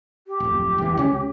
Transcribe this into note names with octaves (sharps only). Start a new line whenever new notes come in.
G4
D1 F2
E1 E3
C#2 C3 C#4